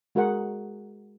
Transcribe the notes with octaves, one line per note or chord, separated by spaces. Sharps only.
G#3 F#4 G#4 A#4 F#5